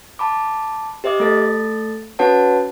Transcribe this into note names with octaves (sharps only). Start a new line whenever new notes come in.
A5 B5 D6
G4 C5 D#5 E5 D6
A3 A4 A6
C#4 F#4 B4 C#5 F#5 A5